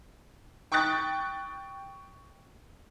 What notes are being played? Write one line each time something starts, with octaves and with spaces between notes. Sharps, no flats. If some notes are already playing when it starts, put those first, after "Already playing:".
G5 C#6 D#6 F#6 A6